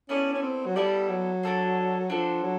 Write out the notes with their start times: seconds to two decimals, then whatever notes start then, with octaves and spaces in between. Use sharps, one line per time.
0.09 B3 C#4 E4 A4 D5
0.33 C#4
0.42 C4
0.66 F#3
0.75 G3 B3 E4 A4 D5
1.09 F#3
1.43 D4 F#4 A4 C5
2.09 F3 D4 F#4 A4 C5
2.43 F#3